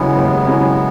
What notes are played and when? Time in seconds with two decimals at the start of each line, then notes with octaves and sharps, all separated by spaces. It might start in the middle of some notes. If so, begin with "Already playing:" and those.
Already playing: D#2 C#3 F#3 G#3 B3 C#4 E4
0.17 D#2
0.45 C#3 F#3 C#4 E4